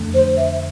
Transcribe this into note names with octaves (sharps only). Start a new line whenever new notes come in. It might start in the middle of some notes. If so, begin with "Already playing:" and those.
Already playing: F2 D3 A3
C5
E5